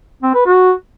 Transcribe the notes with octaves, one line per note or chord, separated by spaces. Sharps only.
C4
B4
F#4